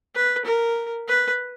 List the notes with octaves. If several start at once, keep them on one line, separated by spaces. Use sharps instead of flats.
B4
A#4
B4